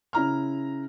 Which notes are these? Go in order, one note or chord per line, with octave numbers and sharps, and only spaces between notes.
C#3 E4 A#5 F6